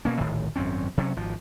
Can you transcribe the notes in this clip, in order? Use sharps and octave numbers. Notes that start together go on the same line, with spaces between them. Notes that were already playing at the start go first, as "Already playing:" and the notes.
B2 A#3 C#4
D1 A#1 A2 D#3
G#1 F#2 C4 C#4
C3 F#3 C#4
G#1 F3